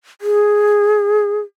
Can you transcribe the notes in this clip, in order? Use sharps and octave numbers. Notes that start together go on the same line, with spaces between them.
G#4